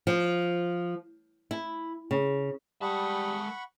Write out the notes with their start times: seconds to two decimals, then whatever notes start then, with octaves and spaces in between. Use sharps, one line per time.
0.07 F3
1.51 E4
2.11 C#3
2.82 G3 G#3 F#5 A5 B5 C#6 D#6